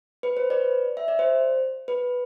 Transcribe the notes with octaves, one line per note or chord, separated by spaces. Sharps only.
B4
C5
B4 D5
E5
D5
C5
B4